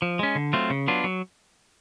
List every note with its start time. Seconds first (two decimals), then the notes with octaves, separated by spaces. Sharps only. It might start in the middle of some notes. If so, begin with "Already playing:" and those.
0.02 F3
0.19 G#3 C#4
0.35 D3
0.53 F#3 A3 C4 F4
0.70 C#3
0.88 F#3 B3 D4 F4
1.04 F#3